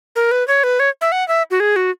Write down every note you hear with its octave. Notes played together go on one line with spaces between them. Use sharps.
A#4
B4
C#5
B4
C#5
E5
F#5
E5
F#4
G#4
F#4